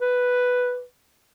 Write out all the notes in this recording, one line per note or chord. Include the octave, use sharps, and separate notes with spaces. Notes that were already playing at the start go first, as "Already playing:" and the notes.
B4